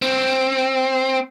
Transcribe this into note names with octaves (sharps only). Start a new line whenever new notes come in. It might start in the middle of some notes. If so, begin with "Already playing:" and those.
C4